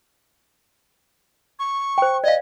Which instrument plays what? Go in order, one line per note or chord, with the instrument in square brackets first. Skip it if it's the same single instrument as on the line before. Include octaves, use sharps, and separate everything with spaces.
[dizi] C#6
[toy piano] C5 G5
[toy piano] D5 F5 [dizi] D#5